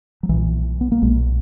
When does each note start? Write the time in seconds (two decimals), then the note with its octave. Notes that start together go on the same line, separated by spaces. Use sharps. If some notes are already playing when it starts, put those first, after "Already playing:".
0.23 F#3
0.29 B1 A#2 E3
0.81 B3
0.92 A#3
1.02 B1 A#2 G#3